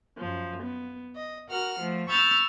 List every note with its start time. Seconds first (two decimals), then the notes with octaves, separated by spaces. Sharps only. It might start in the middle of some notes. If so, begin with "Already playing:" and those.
0.18 F#2 F3
0.62 B3
1.16 D#5
1.49 F#4 A#4 F#5 F6
1.79 F3 A3
2.09 B5 C#6 E6 F6 G6 A6